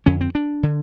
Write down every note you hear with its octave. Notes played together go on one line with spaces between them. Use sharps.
F2 D3 C#4
C4
D4
D3